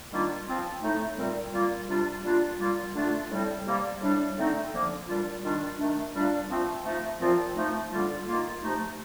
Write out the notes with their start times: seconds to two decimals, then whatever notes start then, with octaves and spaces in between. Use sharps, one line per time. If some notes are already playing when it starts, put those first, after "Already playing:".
0.11 D#3 G3 A#3 D4 F4
0.46 F3 C4 F4
0.82 A2 A3 D#4
1.17 A#2 G3 C4
1.52 A#2 G3 A#3 F4
1.89 C3 G3 D4 F4
2.24 A#2 G3 A#3 D4 F4
2.59 A#2 G3 A#3 F4
2.94 D3 A3 D4 F4
3.30 A2 G3 C4
3.66 C3 G3 A#3
4.00 A2 G3 D4
4.37 D3 A3 C4 D#4
4.72 D3 F3 A#3
5.07 A#2 G3 D4 F4
5.43 D#3 G3 D4 F4
5.78 D#3 A3 D4
6.14 A#2 G3 D4 F4
6.49 F3 A3 C4
6.84 F3 A3 D#4
7.20 A#2 F3 C4 F4
7.55 F3 A3 D#4
7.91 D3 G3 A#3 F4
8.27 D#3 A#3 F4
8.62 C3 F3 A3 D#4